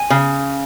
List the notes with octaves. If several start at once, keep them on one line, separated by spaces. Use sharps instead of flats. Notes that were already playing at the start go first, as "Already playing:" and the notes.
Already playing: G#5
C#3